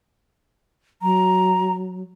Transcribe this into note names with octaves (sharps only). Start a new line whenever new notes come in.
F#3 A#5